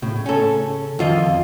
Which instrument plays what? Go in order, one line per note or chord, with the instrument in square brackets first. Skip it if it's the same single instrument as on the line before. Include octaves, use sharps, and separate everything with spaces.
[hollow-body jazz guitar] A2 [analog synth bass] C#3
[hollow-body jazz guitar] C#4 A4
[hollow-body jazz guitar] F2 F4 D#5 [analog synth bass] D#3